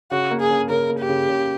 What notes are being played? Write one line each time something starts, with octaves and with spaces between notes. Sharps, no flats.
C#3 F#4
A#3
G#4
C#3
C#3 A#4
A#3
G4
C#3
C#3